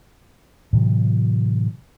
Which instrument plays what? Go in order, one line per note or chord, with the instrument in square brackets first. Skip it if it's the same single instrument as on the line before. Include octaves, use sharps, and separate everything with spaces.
[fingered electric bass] A2 C3 E3 F#3